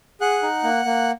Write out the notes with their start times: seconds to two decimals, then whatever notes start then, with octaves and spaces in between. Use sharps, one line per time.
0.21 G#4 F#5 F#6
0.43 D#4
0.63 A#3
0.85 A#3